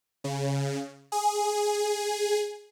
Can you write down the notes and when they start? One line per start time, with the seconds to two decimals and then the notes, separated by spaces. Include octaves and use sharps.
0.24 C#3
1.12 G#4